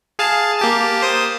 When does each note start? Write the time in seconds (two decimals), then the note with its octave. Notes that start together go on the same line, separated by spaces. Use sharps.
0.19 G#4 F5 A5
0.59 A#3 G4 A5
1.02 C5 D#6